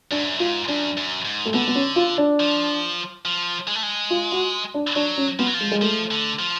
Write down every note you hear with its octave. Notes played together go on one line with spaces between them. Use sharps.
F#2 D4
G#2
F#2
G#2 F4
F#2 D4
F#2
G#2
A3
D3 B3
B3
C#4
F4
D4
F3
F3
G#3
A3
G#3
F4
F#4
D4
F#3 D4
C#4
F3 B3
F#3
F3
G#3
G#3
F3 A3
D3
F3